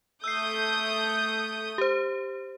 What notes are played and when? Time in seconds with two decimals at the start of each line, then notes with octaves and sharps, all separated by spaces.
0.24 A3 D#6 E6 G6 C7
1.78 G4 C5